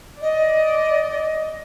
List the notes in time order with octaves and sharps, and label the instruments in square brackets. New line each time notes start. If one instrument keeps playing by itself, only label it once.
[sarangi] D5 [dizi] D#5